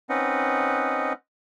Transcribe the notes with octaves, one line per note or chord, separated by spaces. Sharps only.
C4 C#4 D#4 B4 D#5 F#5